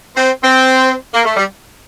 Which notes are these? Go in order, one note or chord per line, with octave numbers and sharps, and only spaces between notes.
C4
C4
A#3
A3
G3